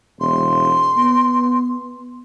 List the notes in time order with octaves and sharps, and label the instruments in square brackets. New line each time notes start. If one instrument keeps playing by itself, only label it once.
[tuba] E1 [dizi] C6
[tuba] B3